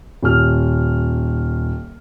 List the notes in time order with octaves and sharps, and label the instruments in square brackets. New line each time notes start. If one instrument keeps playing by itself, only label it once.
[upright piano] D#1 F6